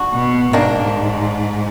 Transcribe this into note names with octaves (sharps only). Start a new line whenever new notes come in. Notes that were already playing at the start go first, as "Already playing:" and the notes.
Already playing: D4 F#4
B2
G#2 D#3 A#3 D4